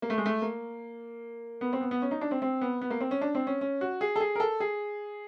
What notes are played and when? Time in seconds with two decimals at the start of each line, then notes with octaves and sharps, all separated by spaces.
0.02 A#3
0.10 A3
0.18 G#3
0.26 A3
0.42 A#3
1.61 B3
1.73 C4
1.81 B3
1.91 B3
2.02 C#4
2.11 D#4
2.21 D4
2.31 C4
2.42 C4
2.61 B3
2.81 B3
2.90 A#3
3.00 C4
3.11 C#4
3.21 D4
3.35 C4
3.47 C#4
3.61 C#4
3.81 F#4
4.01 G#4
4.16 A4
4.20 G#4
4.35 A#4
4.40 A4
4.60 G#4